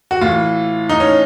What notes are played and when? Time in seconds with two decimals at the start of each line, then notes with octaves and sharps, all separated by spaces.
0.11 F#4
0.21 A2 E3 F4
0.89 D#4
1.00 C#4